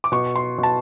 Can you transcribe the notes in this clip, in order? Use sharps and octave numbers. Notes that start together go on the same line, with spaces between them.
D6
B2 C#6
C6
B2
A5